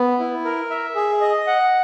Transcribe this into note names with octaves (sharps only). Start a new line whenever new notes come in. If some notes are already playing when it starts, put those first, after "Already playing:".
Already playing: B3
E4
A#4
E5
G#4
D#5
F#5